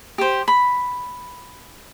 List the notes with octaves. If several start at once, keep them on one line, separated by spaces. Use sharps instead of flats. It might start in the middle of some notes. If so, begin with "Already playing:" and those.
G4 C5
B5